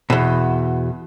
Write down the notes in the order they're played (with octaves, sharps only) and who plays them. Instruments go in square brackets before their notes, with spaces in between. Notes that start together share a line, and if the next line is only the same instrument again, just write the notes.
[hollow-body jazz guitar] E2 B2